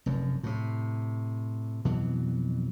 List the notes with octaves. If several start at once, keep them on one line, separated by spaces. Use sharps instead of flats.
F1 F#2
A2 C3
F2 B2 E3 F#3